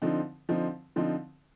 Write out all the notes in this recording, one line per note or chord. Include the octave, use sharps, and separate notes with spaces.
D3 F3 C4 D#4
D3 F3 C4 D#4
D3 F3 C4 D#4